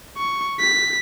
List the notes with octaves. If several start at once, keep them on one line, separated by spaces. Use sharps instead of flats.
C#6
B6